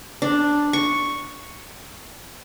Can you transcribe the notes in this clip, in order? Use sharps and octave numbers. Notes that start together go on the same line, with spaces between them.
D4
C#6